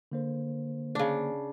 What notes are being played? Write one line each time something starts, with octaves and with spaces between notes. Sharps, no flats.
D3 A#3 C5
C#3 D4